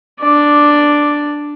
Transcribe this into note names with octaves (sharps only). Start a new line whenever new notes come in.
D4 D5